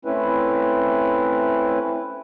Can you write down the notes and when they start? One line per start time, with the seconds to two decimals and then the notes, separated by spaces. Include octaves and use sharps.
0.05 A3 C4 C#4 E4 B4